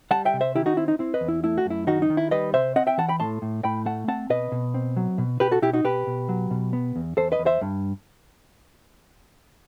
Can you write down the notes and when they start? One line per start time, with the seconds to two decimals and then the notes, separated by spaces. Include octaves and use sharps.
0.11 G3 F#5 A5
0.25 E5 G5
0.33 C3
0.41 C5 E5
0.55 D#3 E4 G4
0.66 D#4 F#4
0.77 C4 E4
0.88 D#4
0.99 C4 E4
1.14 B4 D#5
1.21 E2
1.28 E4
1.43 A3 E4
1.58 F#4
1.66 F#2 E4
1.87 D#3 D#4 F#4
2.02 D#4
2.10 D#3
2.17 E4
2.31 G3 B4 D#5
2.53 C3 C5 E5
2.76 C4 D#5 F#5
2.87 E5 G5
2.98 E3 F#5 A5
3.09 G5 B5
3.20 A2 A5 C6
3.42 A2
3.64 A2 G5 B5
3.86 A3 F#5 A5
4.08 C4 F#5 A5
4.30 B2 B4 D#5
4.52 B2
4.74 C4
4.97 F#3
5.18 B2
5.40 B2 G4 B4
5.51 F#4 A4
5.62 B2 E4 G4
5.73 D#4 F#4
5.84 B2 G4 B4
6.07 B2
6.29 F#3
6.51 B2
6.73 B3
6.96 E2
7.17 E2 A4 C5
7.32 B4 D#5
7.39 E2
7.46 C5 E5
7.61 G2